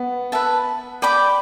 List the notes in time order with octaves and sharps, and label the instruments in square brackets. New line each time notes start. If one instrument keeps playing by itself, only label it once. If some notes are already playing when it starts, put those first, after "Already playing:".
Already playing: [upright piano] B3
[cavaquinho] B4 E5 A5
D5 G5 B5 D6